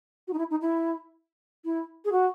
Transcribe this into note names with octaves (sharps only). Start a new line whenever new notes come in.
F#4
D#4
E4
D#4
E4
E4
G#4
F#4